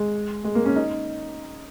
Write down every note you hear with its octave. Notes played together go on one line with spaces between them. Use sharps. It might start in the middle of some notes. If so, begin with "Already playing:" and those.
Already playing: G#3
G#3
A#3
C#4
D#4